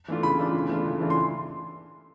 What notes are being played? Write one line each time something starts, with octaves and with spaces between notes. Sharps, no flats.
E3 A3 D4 F4
C#3 B5
E3 A3 D4 F4
C#3
E3 A3 D4 F4
C#3
E3 A3 D4 F4
C6